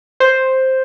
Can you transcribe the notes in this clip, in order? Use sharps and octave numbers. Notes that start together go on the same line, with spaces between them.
C5